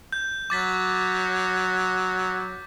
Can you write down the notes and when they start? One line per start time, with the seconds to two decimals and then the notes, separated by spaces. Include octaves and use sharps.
0.12 G6
0.50 F#3 D6 A6 B6